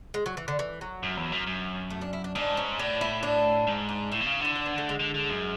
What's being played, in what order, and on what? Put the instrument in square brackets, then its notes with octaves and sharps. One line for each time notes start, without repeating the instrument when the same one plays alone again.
[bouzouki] G#3
F#3
E3
D3
E3
F#3
[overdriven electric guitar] F#2
E2
F#2
F#2
[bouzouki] A3
D4
E4
D4
[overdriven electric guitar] G#2 [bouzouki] D4
[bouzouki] C#4
[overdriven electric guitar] A2 [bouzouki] D4
[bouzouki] E4
D4
[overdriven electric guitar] G#2
[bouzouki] D4
[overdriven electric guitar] A2 [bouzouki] E4
[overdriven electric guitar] B2
C#3
[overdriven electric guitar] D3 [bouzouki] E4
[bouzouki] D4
B3
A3
G#3
[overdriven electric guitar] D3
D3
F#2